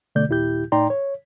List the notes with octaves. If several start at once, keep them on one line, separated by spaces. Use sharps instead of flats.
B2 D3 A3 D5 G6
D#2 A#2 E4 G4 G6
A2 D#4 D5 G5 A#5 C6
C#5